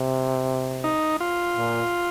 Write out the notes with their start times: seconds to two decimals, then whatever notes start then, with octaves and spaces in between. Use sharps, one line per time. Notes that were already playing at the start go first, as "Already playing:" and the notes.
Already playing: C3
0.84 D#4
1.20 F4
1.57 A#2